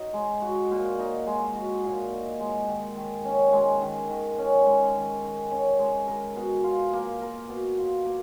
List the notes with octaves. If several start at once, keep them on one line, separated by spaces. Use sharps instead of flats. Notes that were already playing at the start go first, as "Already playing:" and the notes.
Already playing: D#4 F#4
G#3
F#4
A#2
D#4
G#3
F#4
A#2
D#4
G#3
D#3
D#3
C#4
G#3
D#3
D#3
C#4
G#3
D#3
D#3
C#4
G#3
A#4
B2
F4
A#3
A#4
B2
F4
A#3